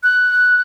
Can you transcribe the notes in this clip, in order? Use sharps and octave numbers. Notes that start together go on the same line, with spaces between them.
F#6